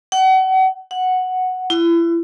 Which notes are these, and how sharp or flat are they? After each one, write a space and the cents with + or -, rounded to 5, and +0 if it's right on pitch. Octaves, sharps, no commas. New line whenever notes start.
F#5 +35
F#5 +0
E4 +35